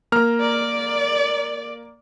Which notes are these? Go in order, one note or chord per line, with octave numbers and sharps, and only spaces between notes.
A#3 A#5 F6
D5